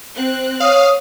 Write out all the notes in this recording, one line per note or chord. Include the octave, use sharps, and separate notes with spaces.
C4 F#6
C#5 F5 D#6